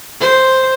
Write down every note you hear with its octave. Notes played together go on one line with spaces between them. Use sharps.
C5